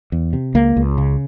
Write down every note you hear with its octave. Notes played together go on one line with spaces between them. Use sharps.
E2
C3
C#2 A#3
C#2
C#3